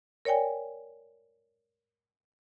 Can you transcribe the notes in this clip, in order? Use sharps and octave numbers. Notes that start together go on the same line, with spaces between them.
A#4 C#5 D5 G5 G#5